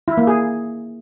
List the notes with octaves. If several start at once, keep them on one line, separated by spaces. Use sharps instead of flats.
E4
A#3
G#4